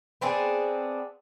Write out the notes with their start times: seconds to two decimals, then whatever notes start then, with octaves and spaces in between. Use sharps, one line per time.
0.21 B3 C4 D4 G#4